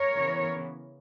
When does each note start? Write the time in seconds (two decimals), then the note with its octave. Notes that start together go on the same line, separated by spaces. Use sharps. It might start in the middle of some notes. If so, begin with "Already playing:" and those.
Already playing: A#4 C#5
0.14 C#3 E3 B3